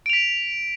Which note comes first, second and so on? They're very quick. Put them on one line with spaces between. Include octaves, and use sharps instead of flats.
D7 F7 B6